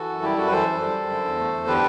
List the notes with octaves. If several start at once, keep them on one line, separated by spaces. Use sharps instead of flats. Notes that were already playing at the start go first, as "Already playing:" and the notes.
Already playing: E3 F#4 A4
F#2
G3 E4 G4
F#2 F#4 A4
B4
E3 A4 C5
F#2
G3
F#2
D3
E2
A3
E2
D3 G4 B4